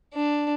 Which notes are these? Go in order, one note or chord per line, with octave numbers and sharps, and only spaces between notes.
D4